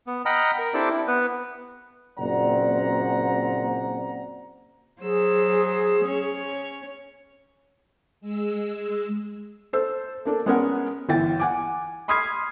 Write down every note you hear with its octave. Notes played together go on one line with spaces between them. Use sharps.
B3
D#5 F#5 G5 A#5 B5 F6
A#4
C4 D4 E4 G4 A4 D5
E4
B3 B4
F#1 A#2 C4 D5 F#5 A#5
F#3 G#4 C5 E6
C#4 C#5
G#3 E6
A4 C5 E6
A#3 D4 A4
G#3 B3 C#4 G#4 A#4 F#5
G1 E3 G5 A6
F#5 G#5 D6
B5 C6 D#6 F6 G#6 C7